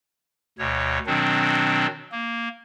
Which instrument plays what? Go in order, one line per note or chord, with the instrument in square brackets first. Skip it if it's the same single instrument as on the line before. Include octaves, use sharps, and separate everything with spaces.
[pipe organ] D2 B2 C#5
B2 D#3 F#3 C4 D4
A#3